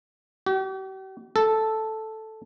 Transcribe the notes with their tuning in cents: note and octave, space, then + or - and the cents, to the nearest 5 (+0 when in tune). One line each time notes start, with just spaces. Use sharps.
G4 -45
A4 -5